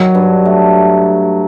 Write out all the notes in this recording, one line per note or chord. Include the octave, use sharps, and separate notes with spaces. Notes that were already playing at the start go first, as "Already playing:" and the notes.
Already playing: D#3 F#3
G2
A3